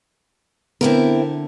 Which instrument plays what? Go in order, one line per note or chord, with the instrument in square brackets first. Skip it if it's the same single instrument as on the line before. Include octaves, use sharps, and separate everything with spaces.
[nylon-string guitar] D3 [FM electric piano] B3 [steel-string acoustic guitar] C4 E4 A#4